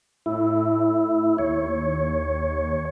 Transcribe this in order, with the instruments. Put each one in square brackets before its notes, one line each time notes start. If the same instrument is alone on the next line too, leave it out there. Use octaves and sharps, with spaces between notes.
[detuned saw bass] A2 [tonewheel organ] E4
[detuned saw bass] D#2 [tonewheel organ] C#5